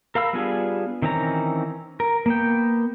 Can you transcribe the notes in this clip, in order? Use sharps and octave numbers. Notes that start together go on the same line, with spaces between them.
A#4 F5 B5 E6
G3 B3 D4 F4 G#4
D#3 E3 C4 C#4 A#5
A#4
A#3 B3 G5